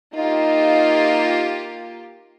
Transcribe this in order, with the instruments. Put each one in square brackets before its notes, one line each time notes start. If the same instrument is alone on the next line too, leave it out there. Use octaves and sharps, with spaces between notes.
[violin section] A#3 F4 G4 [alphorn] D#4